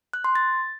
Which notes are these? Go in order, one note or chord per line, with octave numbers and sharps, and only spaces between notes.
F#6
C6
A6